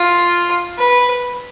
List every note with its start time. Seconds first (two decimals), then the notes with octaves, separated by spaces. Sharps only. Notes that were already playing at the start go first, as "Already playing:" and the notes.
Already playing: F4
0.78 B4